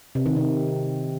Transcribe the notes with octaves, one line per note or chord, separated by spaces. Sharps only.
C3
D#3
C3